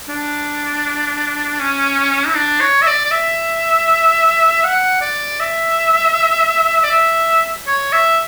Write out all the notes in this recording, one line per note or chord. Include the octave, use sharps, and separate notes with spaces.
D4
C#4
E4
D4
C#5
E5
D5
D5
E5
F#5
D5
E5
D5
E5
C#5
E5